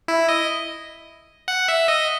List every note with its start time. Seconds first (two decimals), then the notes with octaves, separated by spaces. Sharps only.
0.08 E4
0.29 D#5
1.48 F#5
1.68 E5
1.88 D#5